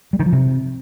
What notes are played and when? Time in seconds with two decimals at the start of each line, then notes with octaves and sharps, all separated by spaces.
0.13 G3
0.20 D#3
0.26 F3
0.32 C3